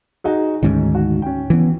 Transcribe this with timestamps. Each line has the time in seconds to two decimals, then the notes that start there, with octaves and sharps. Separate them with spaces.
0.24 D#4 F#4 G#4
0.63 D2 G#2 D#3 C#4
0.95 F#4
1.22 C#4 G5
1.50 E3 B3